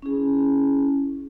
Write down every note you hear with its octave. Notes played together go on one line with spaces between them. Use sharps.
C#4 E4 G#4